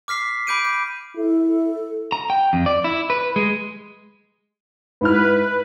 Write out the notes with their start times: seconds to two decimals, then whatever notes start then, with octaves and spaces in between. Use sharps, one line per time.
0.08 D6 F6 B6 C7
0.47 B5 D6 G6 D7 D#7
0.65 D6
1.17 E4 A4
2.12 A#5
2.30 G5
2.53 F2
2.66 D5
2.84 E4
3.10 B4
3.36 G#3
5.01 G#2 E4 B4 F6